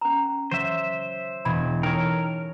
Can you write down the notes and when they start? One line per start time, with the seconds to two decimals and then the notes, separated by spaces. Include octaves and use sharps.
0.01 C#4 A#5
0.51 F#3 C5 E5
1.45 E1 B5 G#6
1.83 D#4 A4 A#4 C#5 G5